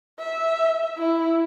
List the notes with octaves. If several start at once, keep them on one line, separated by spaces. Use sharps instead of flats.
E5
E4